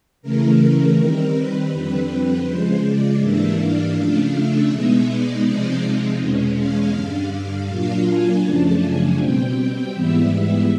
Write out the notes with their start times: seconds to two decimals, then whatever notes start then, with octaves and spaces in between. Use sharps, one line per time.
0.22 C#3 E3 A3 A#4
0.96 D#3 G3 C4
1.33 B4
1.72 F2 D3 G3 C4
2.45 C#3 F3 G#3 C5
2.83 D5
3.20 G#2 E3 G3 A#3 D4 E5
3.58 F5
3.95 C#3 F3 A3 D4
4.32 E5
4.70 B2 G#3 B3 D#4
5.07 D5
5.44 C3 F3 G#3 C4 D#4 D5
6.19 E2 B2 G#3 C#4
6.56 F5
6.94 G2 D3 G3
7.31 F5
7.68 A#2 F#3 A#3 D4 F4
8.06 G#5
8.43 F#2 C#3 F3 A3 D4 A5
8.80 G#5
9.17 B2 G3 C4 G5
9.92 G#2 E3 G3 B3 E5